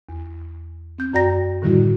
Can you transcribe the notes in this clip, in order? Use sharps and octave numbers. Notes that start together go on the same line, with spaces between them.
E2
C4 G6
F#2 F#4 D5 G5 A#5 A#6
A2 D3 D#3 G3 E4 F#4